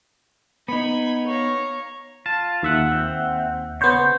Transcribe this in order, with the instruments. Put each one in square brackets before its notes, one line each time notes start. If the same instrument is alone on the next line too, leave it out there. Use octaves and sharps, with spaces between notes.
[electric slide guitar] B3 D#4 [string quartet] B5 G#6
[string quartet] C#5 F5 A#5
[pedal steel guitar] F4 [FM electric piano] A5
[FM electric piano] D#2 E5 F#5
[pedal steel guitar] C4
[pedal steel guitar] C#3 G6 [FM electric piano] B3 C5 C#5